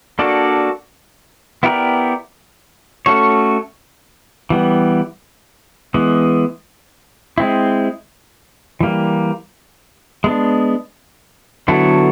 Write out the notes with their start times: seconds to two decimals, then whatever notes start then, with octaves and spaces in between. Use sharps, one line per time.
0.19 A#3 D4 F#4 A4 D5
1.63 B3 E4 G4 A#4 D5
3.06 A3 C#4 F#4 A4 C#5
4.50 E3 G3 B3
5.94 E3 G#3 B3
7.38 G#3 C4 E4
8.81 E3 G3 A#3
10.24 G#3 B3 D4
11.68 D3 F#3 B3 E4 A4